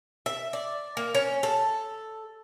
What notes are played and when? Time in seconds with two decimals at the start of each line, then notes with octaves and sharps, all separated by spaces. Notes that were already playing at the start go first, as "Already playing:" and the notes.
0.26 E5
0.53 D5
0.97 A#3
1.15 C#4
1.43 A4